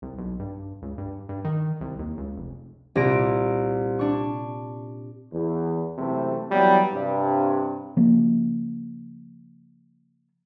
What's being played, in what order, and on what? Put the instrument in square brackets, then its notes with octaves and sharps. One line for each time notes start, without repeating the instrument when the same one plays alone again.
[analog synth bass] C2
B1
G2
C#2
G2
G2
D#3
C2
D#2
C#2
F1
[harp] C2 A#2 A#6 D7
D4 C#6
[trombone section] E2
C#2 F#2 C3 E3 A3 C5
E3 F#3 G3 B3
G2 C3
[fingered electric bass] C#3 F3 A#3